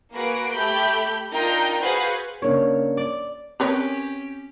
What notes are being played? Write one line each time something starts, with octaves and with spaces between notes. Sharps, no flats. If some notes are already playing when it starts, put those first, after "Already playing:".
A#3 F#4 G#4 B4 D7
A3 G4 B5 G6
D4 D#4 F4 A#4 G5 A#5
F#4 G#4 B4 C5 F5 F#5
C#3 A#3 D4 C#5
D5
C4 C#4 G4 A#4 B4 C#5